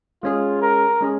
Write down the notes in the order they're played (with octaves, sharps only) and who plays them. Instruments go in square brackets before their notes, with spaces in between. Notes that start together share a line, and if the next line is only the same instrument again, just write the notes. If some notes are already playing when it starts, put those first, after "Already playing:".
[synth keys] G#3 C#4 G#4 [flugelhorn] F4
[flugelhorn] A#4
[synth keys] G#3 C#4 G#4